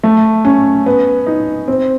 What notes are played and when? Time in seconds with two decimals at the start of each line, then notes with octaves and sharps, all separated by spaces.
0.03 A3
0.45 C#4
0.86 B3
1.26 D#4
1.68 C4